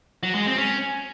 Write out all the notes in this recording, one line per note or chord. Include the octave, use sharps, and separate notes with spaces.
F#3
G#3
C4
C#4